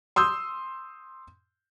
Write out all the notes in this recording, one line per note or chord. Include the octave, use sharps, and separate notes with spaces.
C6 D#6 E6 G6